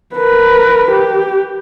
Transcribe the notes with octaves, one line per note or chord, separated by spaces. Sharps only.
A#4 B4
G4